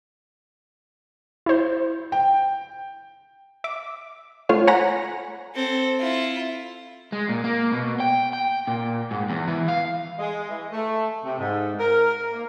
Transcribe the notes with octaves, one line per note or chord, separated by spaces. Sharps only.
E4 C5
G5
E5 D6
A3 F4 C5 C#5 F5
C#5 F#5 G#5 A#5 B5 A#6
C4 A4
E4 F4
G#3
A#2
A#3
B2
G5
G5
A#2
G#2
E2
E3
F5
G#3
E3
A3
C3
G#2
A#4
A#3